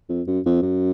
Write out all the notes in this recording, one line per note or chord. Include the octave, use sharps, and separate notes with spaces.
F2
F#2
F2
F#2